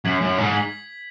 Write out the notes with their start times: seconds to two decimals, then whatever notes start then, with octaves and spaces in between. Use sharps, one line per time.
0.05 F#2 G#6 B6 F#7
0.21 F#2
0.38 G#2
0.54 G#6 B6 F#7